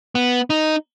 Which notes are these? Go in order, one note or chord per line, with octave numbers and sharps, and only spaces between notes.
B3
D#4